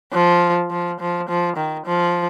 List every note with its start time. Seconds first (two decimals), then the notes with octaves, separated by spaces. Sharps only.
0.13 F3
0.71 F3
1.00 F3
1.29 F3
1.57 D#3
1.86 F3